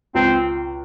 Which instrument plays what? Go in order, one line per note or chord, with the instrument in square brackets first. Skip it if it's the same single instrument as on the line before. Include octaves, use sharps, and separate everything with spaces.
[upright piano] C#2 [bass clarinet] C4